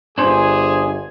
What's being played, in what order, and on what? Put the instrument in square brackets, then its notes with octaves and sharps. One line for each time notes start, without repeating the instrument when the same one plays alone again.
[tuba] G1 [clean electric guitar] D4 C5 [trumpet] G#4 [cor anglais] G#5